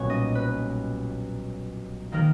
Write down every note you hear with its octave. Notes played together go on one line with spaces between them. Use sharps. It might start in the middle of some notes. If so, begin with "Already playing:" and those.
Already playing: B1 A#2 G3 B3 C#4 B4 C#5
D#5
B4
D#3 A#3 A#4